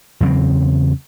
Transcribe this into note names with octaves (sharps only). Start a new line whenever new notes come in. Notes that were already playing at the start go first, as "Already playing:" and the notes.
E2 C#3 F#3 C4